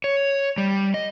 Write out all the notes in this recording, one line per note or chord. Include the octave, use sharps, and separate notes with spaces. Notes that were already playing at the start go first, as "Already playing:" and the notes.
C#5
G3
D#5